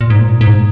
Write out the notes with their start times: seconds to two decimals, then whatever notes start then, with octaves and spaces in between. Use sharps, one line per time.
0.01 A#2
0.10 G#2
0.20 A#2
0.41 G#2